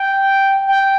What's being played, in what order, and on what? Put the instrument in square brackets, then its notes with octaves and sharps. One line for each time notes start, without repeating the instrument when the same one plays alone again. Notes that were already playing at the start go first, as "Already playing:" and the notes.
Already playing: [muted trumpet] G5
G5